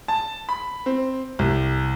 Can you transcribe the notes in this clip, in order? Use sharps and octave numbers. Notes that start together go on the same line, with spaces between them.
A5
B5
C4
C2